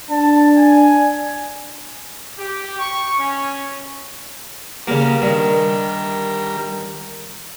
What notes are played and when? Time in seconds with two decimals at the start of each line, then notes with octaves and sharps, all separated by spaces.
0.11 D4 A5
0.57 G#5
2.38 G4
2.78 C#6
3.18 C#4
4.87 C#3 G3 A#3 A#4
5.22 G2 D#3